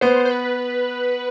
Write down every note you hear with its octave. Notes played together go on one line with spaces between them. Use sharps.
B3 C5
C5
B4